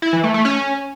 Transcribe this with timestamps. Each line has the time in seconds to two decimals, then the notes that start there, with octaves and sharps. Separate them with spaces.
0.02 E4
0.13 E3
0.24 A3
0.34 A3
0.45 C#4